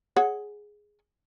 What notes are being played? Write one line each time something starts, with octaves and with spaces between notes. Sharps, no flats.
G#4 C#5 F#5